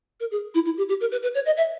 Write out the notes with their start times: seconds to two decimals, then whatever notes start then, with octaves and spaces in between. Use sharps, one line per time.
0.20 A#4
0.31 G#4
0.55 E4
0.65 E4
0.78 G4
0.89 G4
1.01 A#4
1.12 B4
1.23 B4
1.35 C#5
1.46 D#5
1.57 E5